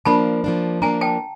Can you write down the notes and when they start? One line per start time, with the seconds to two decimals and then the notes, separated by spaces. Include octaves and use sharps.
0.05 F3 A#3 D4 A5 B5
0.44 F3 A#3 D4
0.82 F3 A#3 D4 G#5 A#5
1.01 G5 A5